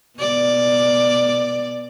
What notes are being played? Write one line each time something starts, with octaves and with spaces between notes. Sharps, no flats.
B2 D5